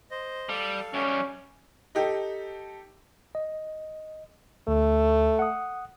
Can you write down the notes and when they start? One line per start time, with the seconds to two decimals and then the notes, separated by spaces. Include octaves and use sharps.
0.11 C5 D#5
0.49 G3 A4 F5
0.94 F#2 G3 C#4
1.95 D#4 G4 A4
3.35 D#5
4.68 D2 A3
5.39 F#5 D#6